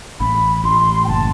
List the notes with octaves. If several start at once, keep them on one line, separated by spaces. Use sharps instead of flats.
A1 B5
A1 C6
G5
F#1 A5